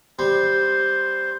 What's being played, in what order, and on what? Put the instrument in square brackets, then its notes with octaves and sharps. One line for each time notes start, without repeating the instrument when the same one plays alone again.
[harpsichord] G3 C4 [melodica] C5 C6